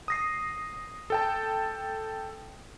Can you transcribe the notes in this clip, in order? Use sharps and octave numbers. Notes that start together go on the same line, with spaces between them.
D#6 A#6 C7
A4 G5 A5